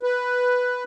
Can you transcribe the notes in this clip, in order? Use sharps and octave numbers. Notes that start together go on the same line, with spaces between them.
B4